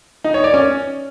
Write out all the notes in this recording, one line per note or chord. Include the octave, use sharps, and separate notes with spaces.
D#4
C#5
D5
C#4